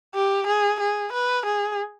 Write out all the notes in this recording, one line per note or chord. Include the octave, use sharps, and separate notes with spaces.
G4
G#4
G#4
B4
G#4